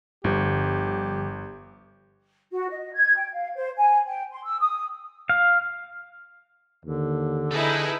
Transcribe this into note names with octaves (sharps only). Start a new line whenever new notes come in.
G1 G2 D3 F3 G4
F#4
D#5
G#6
G5
F5
C5
G#5
G5
C6
E6
D#6
F5
D#2 D3
D#4 E4 G#4 A4 B4